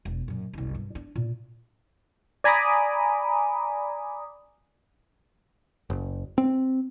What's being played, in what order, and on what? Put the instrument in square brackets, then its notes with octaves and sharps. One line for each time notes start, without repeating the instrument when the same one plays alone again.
[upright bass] E1
F#2 A#2
F#1 C2
G2
D4
A#2
[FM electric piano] D5 G#5 A#5 B5 D6 D#6
[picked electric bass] F#1
C4